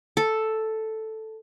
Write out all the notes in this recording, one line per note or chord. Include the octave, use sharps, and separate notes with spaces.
A4